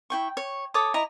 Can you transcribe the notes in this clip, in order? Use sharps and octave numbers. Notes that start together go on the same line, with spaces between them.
E4 G5 C#6
C#5
A4 C#5 D6 D#6
E4 D#5 A#5